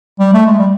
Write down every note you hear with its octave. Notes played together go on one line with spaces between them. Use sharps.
G3
A3
G#3
G3